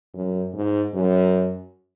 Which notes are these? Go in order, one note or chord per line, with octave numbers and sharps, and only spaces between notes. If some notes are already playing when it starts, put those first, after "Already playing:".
F#2
G#2
F#2